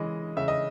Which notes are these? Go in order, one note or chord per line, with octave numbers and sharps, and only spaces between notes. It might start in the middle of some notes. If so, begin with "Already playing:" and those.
Already playing: C#3 E3 G#3 D#5
C#3 E5
D#5